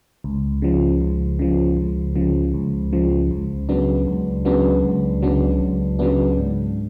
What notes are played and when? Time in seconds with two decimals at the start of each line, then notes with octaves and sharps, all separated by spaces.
0.24 C#2
0.62 C#3 F3
1.01 C#2
1.39 C#3 F3
1.77 C#2
2.16 C#3 F3
2.54 C#2
2.92 C#3 F3
3.31 C#2
3.69 C#3 F#3 B3 D4
4.07 C#2
4.45 C#3 F#3 B3 D4
4.84 C#2
5.22 C#3 F#3 B3 D4
5.60 C#2
5.99 C#3 F#3 B3 D4
6.38 G#2